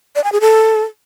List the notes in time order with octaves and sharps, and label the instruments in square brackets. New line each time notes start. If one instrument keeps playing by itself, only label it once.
[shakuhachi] D5
G#5
G#4
A4